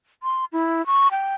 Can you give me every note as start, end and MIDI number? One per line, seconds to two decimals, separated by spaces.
0.23 0.45 84
0.53 0.85 64
0.86 1.08 85
1.11 1.35 79